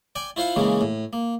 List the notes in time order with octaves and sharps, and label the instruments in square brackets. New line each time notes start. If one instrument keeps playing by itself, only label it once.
[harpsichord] D5 G5 G#5
E4 F4 C5 F5 F#5
C#3 E3 G#3 A#3 C#4
A2
A#3